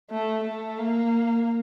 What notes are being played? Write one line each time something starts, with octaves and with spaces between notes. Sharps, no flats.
A3
A3
A#3